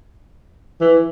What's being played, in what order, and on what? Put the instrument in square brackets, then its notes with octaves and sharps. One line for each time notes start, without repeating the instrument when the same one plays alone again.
[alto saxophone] E3